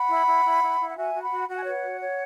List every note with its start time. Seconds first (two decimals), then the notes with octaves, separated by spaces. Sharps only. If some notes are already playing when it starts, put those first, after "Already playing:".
Already playing: F#5 B5
0.09 E4
0.26 E4
0.44 E4
0.62 E4
0.79 E4
0.90 F#5
0.96 F#4 E5 G#5
1.14 F#4
1.22 F#5 B5
1.30 F#4
1.48 F#4 F#5
1.56 G#5
1.62 B4 C#5 F#5
1.83 F#4
2.00 C#5